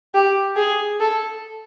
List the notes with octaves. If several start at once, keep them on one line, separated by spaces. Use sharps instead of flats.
G4
G#4
A4